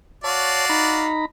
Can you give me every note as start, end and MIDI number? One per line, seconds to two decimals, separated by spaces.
0.24 1.13 66
0.24 0.65 73
0.24 1.13 74
0.24 1.13 77
0.24 0.65 81
0.70 1.25 63
0.70 1.25 82
0.70 1.25 83